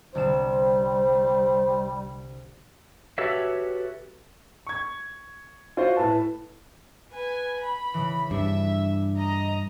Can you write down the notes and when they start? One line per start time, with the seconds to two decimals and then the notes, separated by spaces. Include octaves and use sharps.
0.15 C2 D3 G3 C5 E7
3.18 F#4 G4 A4 B4 C#5 E5
4.67 C#6 G#6
5.77 F4 F#4 C5
5.97 A2 B4 A5
7.12 B4 G#5
7.62 B5
7.94 C#3 E3
8.31 G2 D4 E5
9.17 D#5 A#5